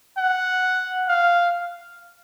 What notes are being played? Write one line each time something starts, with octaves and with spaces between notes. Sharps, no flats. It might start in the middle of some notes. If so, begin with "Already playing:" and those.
F#5
F5